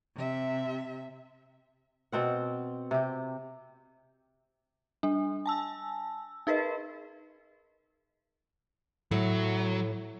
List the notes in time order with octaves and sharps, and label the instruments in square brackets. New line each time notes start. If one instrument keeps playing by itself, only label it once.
[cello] C3 E5
[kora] B2 C4 F#5
C3 G4
[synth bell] G3 D4
G#5 A5 E6
D#4 G#4 A#4 B4 D#5
[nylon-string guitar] A2 [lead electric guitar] F#3